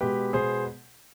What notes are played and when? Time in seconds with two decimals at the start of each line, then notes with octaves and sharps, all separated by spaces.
0.01 B2 G#3 B3 G4 B4
0.33 B2 G#3 B3 G#4 C5